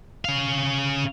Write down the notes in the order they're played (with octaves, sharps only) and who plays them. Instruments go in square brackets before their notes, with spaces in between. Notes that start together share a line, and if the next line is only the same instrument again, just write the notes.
[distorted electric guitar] C#4 F5